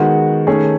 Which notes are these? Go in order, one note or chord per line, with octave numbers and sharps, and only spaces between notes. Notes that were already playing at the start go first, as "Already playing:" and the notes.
Already playing: D#3 G#3 B3 F#4
D#3 A3 C#4 G#4